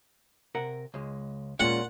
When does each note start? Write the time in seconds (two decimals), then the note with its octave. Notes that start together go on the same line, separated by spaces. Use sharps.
0.55 C3 A#4 F#5
0.94 C#2 G#3
1.60 A#2 G#3 C#4 F4 F#5